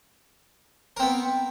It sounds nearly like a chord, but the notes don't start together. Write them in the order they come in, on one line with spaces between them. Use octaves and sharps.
A#4 C4 B3